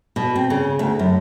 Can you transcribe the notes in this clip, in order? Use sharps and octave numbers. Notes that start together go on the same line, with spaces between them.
B2
C4
C#3
D2
F#2